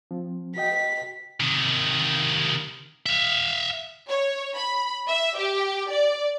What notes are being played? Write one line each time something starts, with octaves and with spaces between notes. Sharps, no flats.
F3 C4
F#4 D#5 G5 B6
C3 D#3
E5 F5
C#5
B5
E5
G4
D5